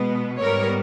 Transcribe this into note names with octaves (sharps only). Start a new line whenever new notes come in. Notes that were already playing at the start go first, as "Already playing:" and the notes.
Already playing: B2 G#3 B3
G#2 G3 B3 A#4 C#5